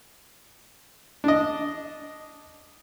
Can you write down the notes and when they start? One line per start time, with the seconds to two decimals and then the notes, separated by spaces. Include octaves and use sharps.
1.24 D4 D#5